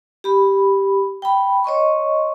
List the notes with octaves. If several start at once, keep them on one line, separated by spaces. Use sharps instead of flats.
G4 B5
G5 B5
C#5 D#5 C6 C#6